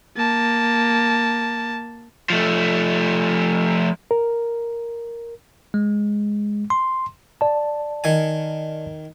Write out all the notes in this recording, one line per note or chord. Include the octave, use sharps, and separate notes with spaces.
A#3 A5
F3 A3
A#4
G#3
C6
D5 A5
D#3 G#5